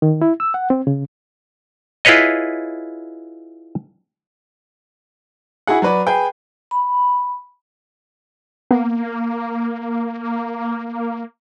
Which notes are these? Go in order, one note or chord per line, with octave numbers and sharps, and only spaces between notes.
D#3
E4
E6
F#5
C4
C#3
E4 F4 G#4 B4 C#5 D#5
E4 F#4 G#4 F#5
F#3 F#4 B4 D5
G#4 B4 G5
B5
A#3 B3